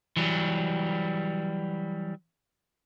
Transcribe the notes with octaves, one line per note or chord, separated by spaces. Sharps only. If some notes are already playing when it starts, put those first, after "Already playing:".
E3 F#3 G3